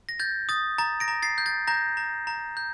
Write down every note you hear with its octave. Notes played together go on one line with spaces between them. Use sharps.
A#6
G6 A6
D#6 A6
A#5 A6
A#6 D7
A#5
A6 C7
G6
A6
A#5 G6 A#6
A#5
A#5
G6